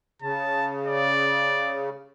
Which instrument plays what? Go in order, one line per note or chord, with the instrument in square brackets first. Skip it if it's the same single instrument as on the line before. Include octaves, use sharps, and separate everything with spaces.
[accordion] C#3 [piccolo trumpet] A5
[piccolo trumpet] D5